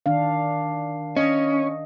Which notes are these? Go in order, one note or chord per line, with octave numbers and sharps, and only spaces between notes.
D#3 D4 F5
C#4 D#5